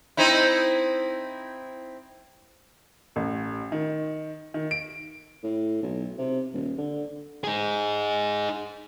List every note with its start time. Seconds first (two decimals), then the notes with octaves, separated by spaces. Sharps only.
0.17 C4 D#4 E4
3.16 A1
3.72 D#3
4.54 D#3
4.71 D7
5.43 A2
5.83 B1
6.19 C3
6.53 D#1
6.78 D3
7.44 D#4 G#4